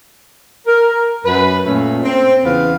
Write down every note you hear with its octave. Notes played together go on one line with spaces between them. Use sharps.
A#4
F#2 B4
A#2 A3 C#4
C4
E2 C#3 E3 B3 B4 F5